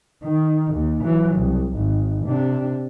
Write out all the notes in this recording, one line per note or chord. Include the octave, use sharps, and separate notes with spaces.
D#3
D#2
E3 F#3
C2
G#1
C3 D4